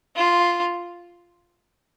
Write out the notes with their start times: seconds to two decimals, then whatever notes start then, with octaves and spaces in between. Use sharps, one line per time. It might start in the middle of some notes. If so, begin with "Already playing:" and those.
0.16 F4